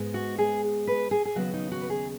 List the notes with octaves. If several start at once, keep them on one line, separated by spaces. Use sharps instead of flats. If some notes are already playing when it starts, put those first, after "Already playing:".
Already playing: G#2 G#3 B3
F#4
G#4
B4
G#4
G#4
D#2 C#3 F#3 B3 F#4
D#4
F#4
B4
G#4